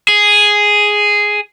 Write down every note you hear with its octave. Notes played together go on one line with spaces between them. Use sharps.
G#4